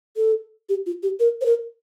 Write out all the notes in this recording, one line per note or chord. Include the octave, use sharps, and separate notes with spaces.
A4
G4
F4
G4
A#4
C5
A#4